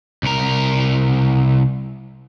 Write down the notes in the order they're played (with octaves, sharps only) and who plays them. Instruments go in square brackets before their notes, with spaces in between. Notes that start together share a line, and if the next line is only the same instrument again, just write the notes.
[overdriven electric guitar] C2 A#4